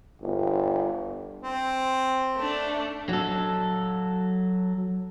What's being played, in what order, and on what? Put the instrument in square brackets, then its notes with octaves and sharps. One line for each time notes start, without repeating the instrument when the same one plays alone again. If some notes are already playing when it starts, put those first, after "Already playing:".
[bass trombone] G1
[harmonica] C4
[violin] A3 D4
[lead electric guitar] F#3 A4